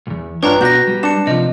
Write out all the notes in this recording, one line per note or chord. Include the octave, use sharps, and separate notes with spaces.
B1 E2
G2 D4 E4 F4 B4 C#5 G5 A#5
B2 F#4 G6 A#6
G3
D4 C#7 E7
C3 F3 D#5